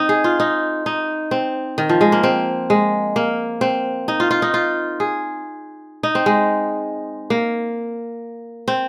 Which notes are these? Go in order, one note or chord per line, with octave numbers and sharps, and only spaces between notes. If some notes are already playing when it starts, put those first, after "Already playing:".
Already playing: C4 D#4
G#4
F4
D#4
D#4
C4
D#3
F3
G#3
A#3
C4
G#3
A#3
C4
D#4
F4
F4
D#4
F4
G#4
D#4
C4
G#3
A#3
C4